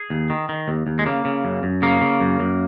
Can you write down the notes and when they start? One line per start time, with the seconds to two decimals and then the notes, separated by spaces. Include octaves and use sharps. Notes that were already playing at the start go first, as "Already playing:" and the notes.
Already playing: G#4
0.10 D#2
0.30 D#3
0.49 D#3
0.68 D#2
0.87 D#2
0.99 G#3
1.06 C#3 A#3
1.25 C#3
1.45 F#2
1.63 F#2
1.82 C#3 A#3
2.01 C#3
2.20 F#2
2.40 F#2